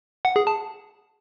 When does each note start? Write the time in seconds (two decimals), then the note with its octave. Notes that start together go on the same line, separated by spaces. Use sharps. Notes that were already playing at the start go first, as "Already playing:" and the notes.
0.25 F#5
0.36 G#4
0.47 A5